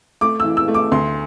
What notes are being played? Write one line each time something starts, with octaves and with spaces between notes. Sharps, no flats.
A3 D6
E3 E6
E6
A3
D6
D2 C6